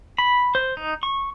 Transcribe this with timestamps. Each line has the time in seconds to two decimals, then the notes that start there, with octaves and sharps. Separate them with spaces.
0.18 B5
0.55 C5
0.77 D#4
1.03 C#6